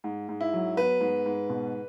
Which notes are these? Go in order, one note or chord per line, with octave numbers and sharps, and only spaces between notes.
G#2
G#2
E4
F#3
B3 B4
G#2
G#2
B2